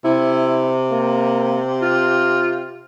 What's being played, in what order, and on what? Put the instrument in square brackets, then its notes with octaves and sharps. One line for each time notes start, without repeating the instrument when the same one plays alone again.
[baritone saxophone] C3 [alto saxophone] E4
[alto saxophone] A#3
F4